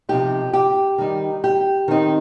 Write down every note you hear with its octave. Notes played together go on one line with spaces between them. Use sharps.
C3 F3 D#4 G4
G4
D#3 G3 D#4
G4
D#3 C4 D#4